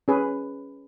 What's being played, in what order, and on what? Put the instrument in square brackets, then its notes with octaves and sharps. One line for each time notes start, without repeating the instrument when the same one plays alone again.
[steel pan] C#4 G#4 B4